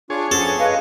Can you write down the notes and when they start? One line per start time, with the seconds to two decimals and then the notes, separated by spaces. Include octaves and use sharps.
0.10 D4 F4 G#4 C#5 D6
0.32 F3 B3 C#4 A4
0.59 G#3 B4 D#5 F5